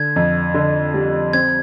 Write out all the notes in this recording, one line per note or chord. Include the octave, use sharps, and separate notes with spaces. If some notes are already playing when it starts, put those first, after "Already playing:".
Already playing: D3 G#6
F2
D3
G3
C4 G#6